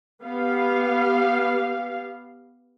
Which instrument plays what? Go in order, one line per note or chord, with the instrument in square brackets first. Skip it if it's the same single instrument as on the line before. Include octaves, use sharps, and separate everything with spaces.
[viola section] B3 G4 F5